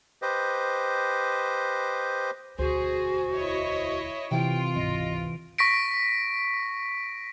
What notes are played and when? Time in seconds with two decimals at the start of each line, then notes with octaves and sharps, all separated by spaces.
0.22 G4 B4 C5 D#5
2.59 E1 D2 F#4 G#4 C5
3.36 E4 C#5 D#5
4.31 C3 E3 F4 G5 D7
4.75 G#1 C#2 D#5
5.58 C#6 A#6 B6 D7